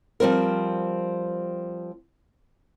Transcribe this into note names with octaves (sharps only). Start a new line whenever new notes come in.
F3 G3 C4 A#4